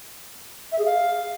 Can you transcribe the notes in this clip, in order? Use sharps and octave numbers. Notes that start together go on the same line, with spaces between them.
E5
G#4
F5